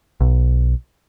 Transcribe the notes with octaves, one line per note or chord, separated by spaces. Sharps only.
B1